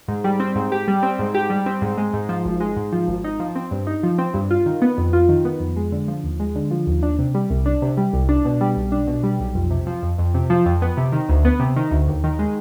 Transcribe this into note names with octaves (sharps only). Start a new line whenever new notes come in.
G#2
G3
C4
G#2
G4
G3
C4
G#2
G4
G3
C4
G#2
G#3
G#2
F3
G#1
G#3
G#2
F3
G#1
D#4
F3
C4
G2
D#4
F3
C4
G2
F4
D#3
B3
F2
F4
D#3
B3
F2
G#3
D3
F3
D#2
G#3
D3
F3
D#2
D4
C3
G3
C2
D4
C3
G3
C2
D4
B2
G3
B1
D4
B2
G3
B1
F2
C3
F3
F2
F2
C3
F3
F2
B3
C3
D#3
D2
B3
C3
D#3
D2
D#2
D#3
G#3